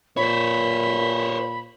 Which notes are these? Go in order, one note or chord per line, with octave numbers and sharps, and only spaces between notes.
A#2 C5 C#5 B5